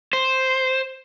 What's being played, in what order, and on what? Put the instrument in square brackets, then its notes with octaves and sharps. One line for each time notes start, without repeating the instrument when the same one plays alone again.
[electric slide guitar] C5